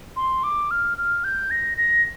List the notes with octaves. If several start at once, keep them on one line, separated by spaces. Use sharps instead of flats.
C6
D6
F6
F6
G6
A#6
A#6